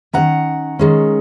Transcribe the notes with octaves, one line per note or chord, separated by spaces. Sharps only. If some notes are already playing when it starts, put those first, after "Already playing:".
D#3 G#3 C#4 F#5 A#5
D#3 G#3 C#4